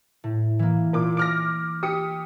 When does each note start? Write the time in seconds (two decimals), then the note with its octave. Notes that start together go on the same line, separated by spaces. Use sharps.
0.24 A2
0.59 E3 A#3
0.93 A#2 D6
1.17 D6 F6 A#6 D7
1.83 G4 D#6 C#7